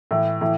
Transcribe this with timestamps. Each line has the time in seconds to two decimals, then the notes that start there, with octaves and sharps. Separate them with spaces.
0.11 A2 E3
0.41 A2 E3